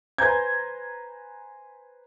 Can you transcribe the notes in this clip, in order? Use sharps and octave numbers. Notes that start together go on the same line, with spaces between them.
B4 C5 G#5 A#5 G6 G#6